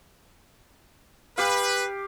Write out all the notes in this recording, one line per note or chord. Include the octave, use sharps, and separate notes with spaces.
G4 B4 F5